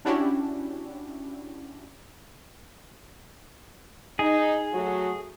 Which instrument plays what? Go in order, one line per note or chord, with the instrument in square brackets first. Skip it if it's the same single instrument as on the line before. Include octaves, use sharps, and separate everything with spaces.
[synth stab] C#4 D4 E4 F#4 G4
[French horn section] D#4 [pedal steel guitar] G#4
[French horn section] F#3 A3 F#4